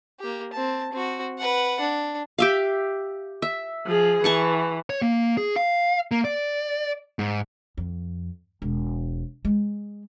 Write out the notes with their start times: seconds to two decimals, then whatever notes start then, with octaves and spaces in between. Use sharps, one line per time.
0.20 A#3 G4
0.53 C4 A5
0.93 C4 F#4
1.38 B4 F#5
1.80 D4
2.38 G4 E5 F5
3.42 E5
3.86 F3 G#4
4.24 E3 F#5 A5 C#6
4.90 C#5
5.02 A#3
5.37 G#4
5.56 F5
6.11 A#3
6.25 D5
7.19 G#2
7.77 F2
8.62 E1
9.45 G#3